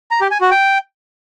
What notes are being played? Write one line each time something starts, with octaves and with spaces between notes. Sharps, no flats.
A#5
G4
G#5
F#4
G5